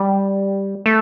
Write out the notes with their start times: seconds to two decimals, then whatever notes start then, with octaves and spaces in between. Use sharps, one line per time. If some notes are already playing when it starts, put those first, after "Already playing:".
Already playing: G3
0.86 A3